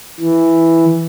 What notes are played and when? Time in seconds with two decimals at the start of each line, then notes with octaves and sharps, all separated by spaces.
0.20 E3